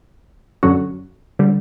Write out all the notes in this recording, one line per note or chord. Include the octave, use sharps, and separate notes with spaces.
F#2 D3 F#3 C#4 F#4
D3 G3